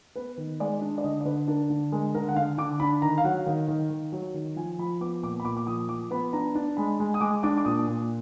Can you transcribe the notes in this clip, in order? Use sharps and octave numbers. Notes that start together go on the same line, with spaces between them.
B3 B4
D#3
G#3 D5
D4
D5
D3 D#5
D5
D3 B4
D4 A#4
D3
G#3 A#4
D3 A#4
F#5
D3 F5
D3 D6
D4 B5
D#3 A#5
F5
F#3 F#5
D#3 F5
D#3
D#3
F#3
D#3
F3 G#5
F3 B5
B3 D6
A#2 D6
B5
A#2 D6
D6
F3 D#6
F3 D6
B3 B5
D4 A#5
D4
G#3 B5
G#3
D#6
G#3 D6
D4 D6
D6
A#2 D#6
A#2